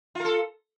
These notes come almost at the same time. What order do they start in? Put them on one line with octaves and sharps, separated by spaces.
F4 A#4 A4